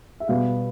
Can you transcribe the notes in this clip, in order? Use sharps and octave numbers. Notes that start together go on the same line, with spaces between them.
E5
B2 G3 B3 F5